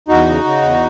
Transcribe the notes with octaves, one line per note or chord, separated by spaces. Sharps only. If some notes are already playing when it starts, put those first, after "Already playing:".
E2 D#4 F#4
C#3
C#3
E2